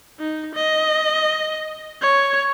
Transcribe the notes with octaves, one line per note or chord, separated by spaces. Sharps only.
D#4
D#5
C#5